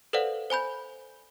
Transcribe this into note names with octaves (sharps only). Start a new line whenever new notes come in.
A4 B4 C5 D5 F5 F#5
C5 G#5 B5 G6